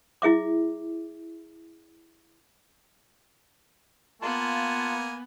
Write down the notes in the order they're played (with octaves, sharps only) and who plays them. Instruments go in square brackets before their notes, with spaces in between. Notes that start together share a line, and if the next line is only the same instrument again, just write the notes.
[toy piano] E4 G#4 E5 D6
[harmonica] A#3 G#5 [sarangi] B3 [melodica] F4 A5